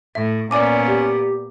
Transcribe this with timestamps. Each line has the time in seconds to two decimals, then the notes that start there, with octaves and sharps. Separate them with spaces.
0.15 A2 E5
0.51 A#2 B3 C#4 D5 G#5 D6
0.87 G4